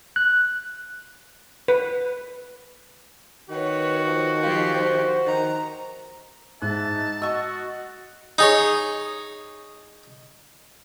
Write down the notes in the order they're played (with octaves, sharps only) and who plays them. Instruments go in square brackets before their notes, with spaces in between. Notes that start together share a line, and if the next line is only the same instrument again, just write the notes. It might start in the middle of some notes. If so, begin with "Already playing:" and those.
[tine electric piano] F#6
[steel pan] B4
[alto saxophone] D#3 [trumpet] F#4 [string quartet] B4 C#5
[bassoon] F3
[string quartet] F3 G4 [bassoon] F4
[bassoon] C5
[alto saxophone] D#3 [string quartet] A#5
[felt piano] G#2 F#6 [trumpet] E5 [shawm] A5
[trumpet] D#4
[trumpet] F#4 [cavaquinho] D#5 C#6 [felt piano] E6
[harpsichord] D#4 G#4 C#5